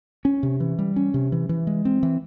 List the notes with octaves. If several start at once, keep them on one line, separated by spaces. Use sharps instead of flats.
C#4
C3
E3
G3
C#4
C3
E3
E3
G#3
C4
E3